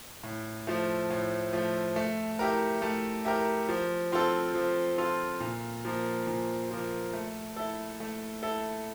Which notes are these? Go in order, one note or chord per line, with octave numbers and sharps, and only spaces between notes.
A2
F3 A3
A2
F3 A3
A3
E4 G4 A#4
A3
E4 G4 A#4
F3
C4 F4 A4
F3
C4 F4 A4
A#2
F3 A#3
A#2
F3 A#3
A3
E4 A4
A3
E4 A4